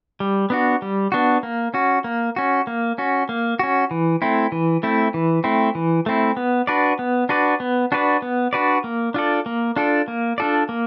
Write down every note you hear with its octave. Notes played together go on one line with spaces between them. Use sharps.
G3
B3 D4 F#4
G3
B3 D4 F#4
A#3
C#4 F#4
A#3
C#4 F#4
A#3
C#4 F#4
A#3
C#4 F#4
E3
A3 C4 E4
E3
A3 C4 E4
E3
A3 C4 E4
E3
A3 C4 E4
B3
D4 F#4 B4 D5
B3
D4 F#4 B4 D5
B3
D4 F#4 B4 D5
B3
D4 F#4 B4 D5
A#3
D4 F4 A4 D5
A#3
D4 F4 A4 D5
A#3
D4 F4 A4 D5
A#3